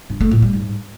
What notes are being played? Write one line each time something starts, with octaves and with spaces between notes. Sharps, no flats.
G2
A3
A2
G3
G#2